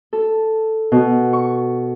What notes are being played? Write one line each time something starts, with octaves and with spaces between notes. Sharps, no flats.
A4
B2
C#6